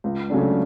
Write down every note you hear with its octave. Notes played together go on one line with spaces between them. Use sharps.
C#2
C#3 F#3 A3 D4